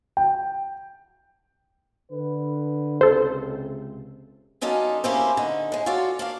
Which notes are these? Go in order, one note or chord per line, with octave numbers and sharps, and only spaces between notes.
G5
D3 B4
C#2 C3 A4 C5
F#3 C#4 D#4 F4 A4 D5
A#3 C4 C#4 E4 G4 C5
D3 D#4
A2 G#3
F4 F#4 A4 C#5 D5
A#3 D4 F5